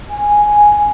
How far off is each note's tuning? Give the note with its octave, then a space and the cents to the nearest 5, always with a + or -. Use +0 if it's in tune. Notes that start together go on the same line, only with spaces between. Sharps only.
G#5 +0